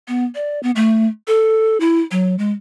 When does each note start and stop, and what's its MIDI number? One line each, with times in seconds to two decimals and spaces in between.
0.08 0.25 59
0.35 0.61 74
0.63 0.71 59
0.76 1.07 57
1.27 1.80 69
1.80 2.01 64
2.11 2.37 54
2.39 2.51 56